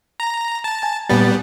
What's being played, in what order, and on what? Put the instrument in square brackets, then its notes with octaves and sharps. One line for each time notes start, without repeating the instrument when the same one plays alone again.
[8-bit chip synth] A#5
A5
[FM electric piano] G#5
[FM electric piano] A#2 A6 [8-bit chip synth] G3 B3